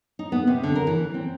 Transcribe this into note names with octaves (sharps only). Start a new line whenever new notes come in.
D#4
B3
C3
D3
A#4
E3
C4